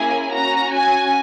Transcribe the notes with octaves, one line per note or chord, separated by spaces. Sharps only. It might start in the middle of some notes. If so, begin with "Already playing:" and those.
Already playing: A#3 C#4 E4 G#4 G#5
C#4 F#4 A#5
G#5